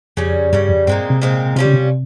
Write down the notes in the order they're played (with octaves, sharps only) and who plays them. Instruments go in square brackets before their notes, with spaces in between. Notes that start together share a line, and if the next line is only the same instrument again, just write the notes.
[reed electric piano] F2 [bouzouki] C#3 G3 C#4
[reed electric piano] G2 [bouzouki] C#3 G3 C#4
[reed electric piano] F2
[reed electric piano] G2 [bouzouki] A#2 G#3 C4
[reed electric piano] C3
[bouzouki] A#2 G#3 C4
[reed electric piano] C3 [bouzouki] G3 C#4 F4
[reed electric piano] C#3
C3